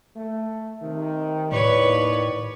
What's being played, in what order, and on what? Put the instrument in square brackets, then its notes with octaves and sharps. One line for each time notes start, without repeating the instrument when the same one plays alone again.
[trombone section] A3
C3 D#3
[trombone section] D#2 [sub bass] A2 [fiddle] B4 C#5 [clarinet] D5